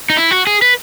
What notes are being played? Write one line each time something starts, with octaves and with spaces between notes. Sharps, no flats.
D#4
E4
F#4
G#4
B4